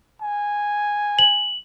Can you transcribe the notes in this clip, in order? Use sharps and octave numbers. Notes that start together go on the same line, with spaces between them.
G#5
F#7